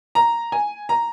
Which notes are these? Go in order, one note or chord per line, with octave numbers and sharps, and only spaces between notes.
A#5
G#5
A#5